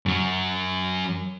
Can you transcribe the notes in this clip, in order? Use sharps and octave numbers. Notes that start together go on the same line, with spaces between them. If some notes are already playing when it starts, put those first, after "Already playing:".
F#2 F#3